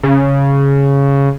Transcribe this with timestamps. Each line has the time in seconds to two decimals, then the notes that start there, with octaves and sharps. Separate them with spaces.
0.03 C#3